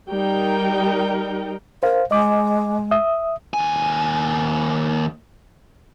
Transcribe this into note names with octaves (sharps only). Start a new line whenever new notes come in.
G3 D#4 A#4 G5
A#4 C5 F5
G#3 D#5 D6
E5 D#6
D#2 G#5